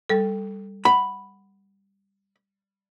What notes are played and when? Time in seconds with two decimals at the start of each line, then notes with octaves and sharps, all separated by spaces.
0.09 G3 A4
0.85 F#5 B5